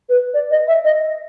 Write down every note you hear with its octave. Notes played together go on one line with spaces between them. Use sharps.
B4
D5
D#5
E5
D#5
D#5